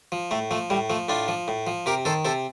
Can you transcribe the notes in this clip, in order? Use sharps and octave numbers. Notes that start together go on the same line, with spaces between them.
F3
A2 A3
F3 A3
A2 G3
F3 A3
A2 D4 F4
F3
A2
F3
C3 G4 A#4
D#3 A4 C5
C3 A4 C5